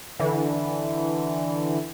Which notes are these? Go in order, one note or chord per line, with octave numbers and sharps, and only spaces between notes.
D3 E3